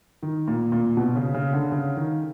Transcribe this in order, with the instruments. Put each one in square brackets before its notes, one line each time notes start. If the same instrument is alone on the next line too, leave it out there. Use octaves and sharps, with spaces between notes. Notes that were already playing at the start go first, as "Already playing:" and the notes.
[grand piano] D#3
A#2
A#2
B2
C#3
C#3
D3
C#3
D#3